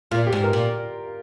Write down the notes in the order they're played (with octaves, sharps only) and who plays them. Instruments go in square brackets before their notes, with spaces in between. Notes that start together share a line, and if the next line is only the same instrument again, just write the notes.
[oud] A#2 [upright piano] F4
[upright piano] G4
[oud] G#2
[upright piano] A#4
[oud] A#2